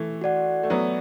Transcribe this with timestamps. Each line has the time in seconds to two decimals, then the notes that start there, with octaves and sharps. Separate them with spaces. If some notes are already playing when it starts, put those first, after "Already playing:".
Already playing: E3 A3
0.21 F#4 D5 F#5
0.63 A3
0.70 F#3 B3